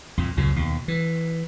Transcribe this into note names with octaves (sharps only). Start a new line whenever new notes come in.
F2 A#2
C#2 F#2 A#2 C#3
D#2 B2
E3